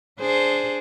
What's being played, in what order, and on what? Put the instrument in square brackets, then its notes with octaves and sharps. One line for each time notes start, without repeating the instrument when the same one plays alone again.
[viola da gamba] D4 G#4 C5